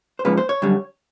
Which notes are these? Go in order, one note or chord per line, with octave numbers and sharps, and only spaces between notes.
C5
G#2 F3 A#3 C#4 B4
C5
C#5
F#2 D3 G3